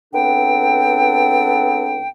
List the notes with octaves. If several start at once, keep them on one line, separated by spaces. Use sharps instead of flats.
C#2 B3 C4 D4 A4 G5